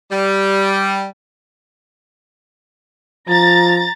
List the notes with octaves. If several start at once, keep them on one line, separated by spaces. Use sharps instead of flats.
G3
F3 A#5 A6